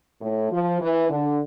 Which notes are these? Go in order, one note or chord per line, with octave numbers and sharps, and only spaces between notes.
A2
F3
E3
D3